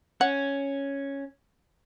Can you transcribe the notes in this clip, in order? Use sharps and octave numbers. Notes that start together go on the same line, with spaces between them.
C#4 F#5